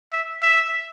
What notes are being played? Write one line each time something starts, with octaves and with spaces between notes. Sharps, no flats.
E5
E5